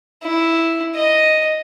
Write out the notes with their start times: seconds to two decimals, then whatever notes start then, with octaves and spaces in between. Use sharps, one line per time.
0.24 E4
0.95 D#5